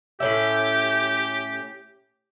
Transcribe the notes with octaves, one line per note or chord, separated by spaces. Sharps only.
A2 C#4 G4 E5